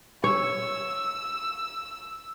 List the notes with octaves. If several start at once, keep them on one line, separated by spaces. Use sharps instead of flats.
C#5 E6